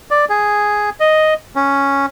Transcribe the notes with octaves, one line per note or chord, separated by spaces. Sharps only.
D5
G#4
D#5
C#4